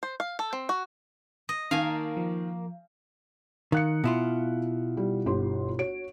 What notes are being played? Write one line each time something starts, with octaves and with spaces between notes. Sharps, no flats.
C5
F5
A4
C4
F#4
D#5
D#3 A#3 F5 G#5 A5
F3
D#3 F5 F#6 C#7
B2 E4 F4
G3
G1 G4 C6
F#4 C#5 D7